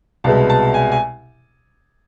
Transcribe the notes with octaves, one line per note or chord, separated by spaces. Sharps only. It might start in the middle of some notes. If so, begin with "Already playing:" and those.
C2 B2 G#3 A5
A5
G#5
G#5